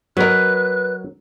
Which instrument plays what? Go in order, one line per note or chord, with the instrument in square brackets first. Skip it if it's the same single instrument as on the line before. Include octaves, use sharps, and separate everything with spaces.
[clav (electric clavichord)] F#3 A#4 [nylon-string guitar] B4 D#5 [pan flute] F#6